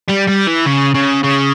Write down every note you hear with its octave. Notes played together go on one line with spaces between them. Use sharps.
G3
G3
E3
C#3
C#3
C#3